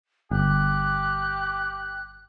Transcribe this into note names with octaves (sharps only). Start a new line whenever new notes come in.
G1 G4 F#6